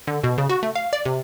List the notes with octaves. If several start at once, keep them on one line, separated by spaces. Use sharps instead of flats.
D3
B2
C#3
F#4
A3
F5
D5
C3